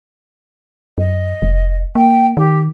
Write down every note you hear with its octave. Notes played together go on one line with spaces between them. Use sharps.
F#2 D#5
F1
A#3 G5
D#3 G4